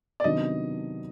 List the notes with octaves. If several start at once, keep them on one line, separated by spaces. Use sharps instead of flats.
D5
C3 D#3 F#3 B3 D4 D#5